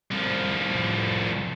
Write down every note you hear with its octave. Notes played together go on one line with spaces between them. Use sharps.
C2 F3